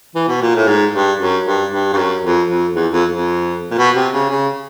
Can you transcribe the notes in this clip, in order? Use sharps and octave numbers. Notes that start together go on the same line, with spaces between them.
E3
B2
A#2
A2
G#2
G2
F#2
G2
G2
G2
F#2
F2
F2
E2
F2
F2
A#2
B2
C3
C#3
C#3